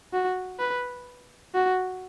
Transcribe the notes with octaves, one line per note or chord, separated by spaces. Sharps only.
F#4
B4
F#4